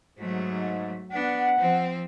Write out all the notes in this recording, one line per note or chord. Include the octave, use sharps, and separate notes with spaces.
G#2 F#3 A3
B3 D4 F#5
F3 C4